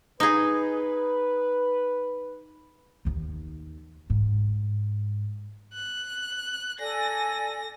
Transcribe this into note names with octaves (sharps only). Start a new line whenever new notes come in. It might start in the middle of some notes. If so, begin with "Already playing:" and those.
D#4 G#4 B4
D#2 D#3
G#2
F#6
A4 D5 G#5 A#6